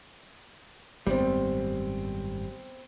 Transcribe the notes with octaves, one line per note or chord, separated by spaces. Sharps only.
G#1 F#2 A2 G3 B3 C4